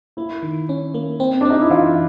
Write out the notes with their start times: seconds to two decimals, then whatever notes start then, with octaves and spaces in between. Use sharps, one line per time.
0.17 A#3 E4
0.43 D#3
0.69 C#4
0.94 A#3
1.20 C4
1.41 C4 D4
1.50 D#4
1.61 E4
1.70 E3 F4